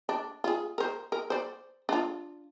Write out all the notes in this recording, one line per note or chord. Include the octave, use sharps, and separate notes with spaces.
D4
F4 G#4
A#4 C5
A#4
C5 D5
D4 F4